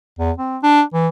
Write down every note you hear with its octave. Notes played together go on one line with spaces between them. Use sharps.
E2
C4
D4
E3